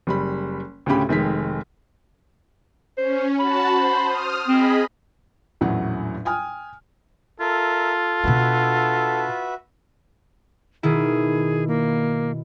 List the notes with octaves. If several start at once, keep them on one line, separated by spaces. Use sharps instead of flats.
F#1 G3 B5
D2 A2 C#3 C#4 G4 B5
F1 D#3 G#3 B6
C#4 C5
F#4 A5 B5
C5
D#6 F6
C4 G#4 D#5 B5
A#1 E2 A2 F#3 C#4 F#5
G5 G#5 D#6 F6
F4 A4 A#4 E5
B2 D4 F#4 B4 E5
B2 D#3 E4 G#4
A#3